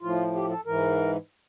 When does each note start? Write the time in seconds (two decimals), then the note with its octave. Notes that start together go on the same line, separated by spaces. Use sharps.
0.01 A2 F3 F4
0.34 G4
0.49 A4
0.65 G#2 E3 A#4